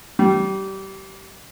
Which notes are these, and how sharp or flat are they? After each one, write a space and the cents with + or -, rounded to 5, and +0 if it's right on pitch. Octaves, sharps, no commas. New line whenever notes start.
G3 -25